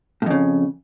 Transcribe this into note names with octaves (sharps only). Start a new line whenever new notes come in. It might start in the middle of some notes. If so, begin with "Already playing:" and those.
F2 A2 C#3